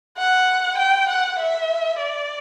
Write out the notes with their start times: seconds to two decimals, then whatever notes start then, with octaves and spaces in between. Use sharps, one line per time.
0.17 F#5
0.78 G5
1.09 F#5
1.39 E5
1.99 D5